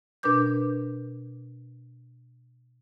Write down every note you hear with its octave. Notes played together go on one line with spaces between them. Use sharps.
B2 D4 A#4 B4 D6 G6